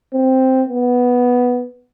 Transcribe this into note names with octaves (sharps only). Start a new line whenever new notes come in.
C4
B3